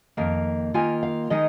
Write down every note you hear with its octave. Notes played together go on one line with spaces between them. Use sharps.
F2 D#3 A#3 F5
D#3 A#3 F4 G#5
F5
D#3 G#3 D#4 D#5